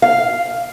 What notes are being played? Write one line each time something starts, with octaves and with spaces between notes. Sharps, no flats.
F5